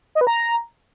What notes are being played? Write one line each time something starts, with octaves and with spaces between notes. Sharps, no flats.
D#5
B4
A#5